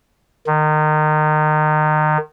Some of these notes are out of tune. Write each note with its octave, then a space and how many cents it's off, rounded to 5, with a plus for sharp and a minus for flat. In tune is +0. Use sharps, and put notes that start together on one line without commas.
D#3 -25